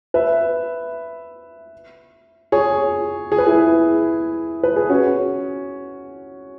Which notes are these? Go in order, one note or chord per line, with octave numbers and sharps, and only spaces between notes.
B4 E5
G#4 C#5
G#4
B4
E4 G#4
B4
G#4
C#4 F#4